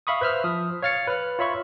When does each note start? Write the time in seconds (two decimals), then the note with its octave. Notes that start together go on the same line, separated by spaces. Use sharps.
0.07 E5 F5 B5 C#6 D#6
0.21 B4 C5 E5 E6 F6
0.44 F3 D#6
0.82 C#5 F5 F6 A6 C#7
1.07 B4 F6
1.39 F4 C#5 E5 B5 C#6